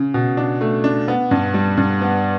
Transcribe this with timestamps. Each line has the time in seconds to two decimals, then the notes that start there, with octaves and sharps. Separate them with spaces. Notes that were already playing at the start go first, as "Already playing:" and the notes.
Already playing: C#3
0.14 B2
0.37 D4
0.61 A3
0.84 D4
1.08 B3
1.31 G2
1.54 G3
1.77 G2
2.01 B3